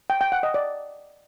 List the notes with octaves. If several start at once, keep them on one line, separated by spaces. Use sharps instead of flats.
G5
G5
F#5
D#5
D5